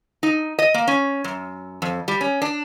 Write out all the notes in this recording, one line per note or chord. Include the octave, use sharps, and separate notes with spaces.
D#4
D#5
A#3
C#4
F#2
F2
G3
C#4
D4